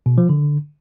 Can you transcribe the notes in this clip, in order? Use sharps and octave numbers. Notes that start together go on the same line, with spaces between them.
B2
F3
D3